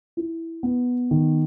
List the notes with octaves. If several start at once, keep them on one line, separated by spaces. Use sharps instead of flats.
E4
B3
D#3